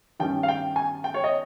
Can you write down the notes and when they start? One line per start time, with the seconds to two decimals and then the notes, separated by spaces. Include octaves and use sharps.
0.20 G2 D#3 G3 C#4 G5
0.43 F5
0.48 G5
0.76 G#5
1.04 G5
1.14 C#5
1.24 D#5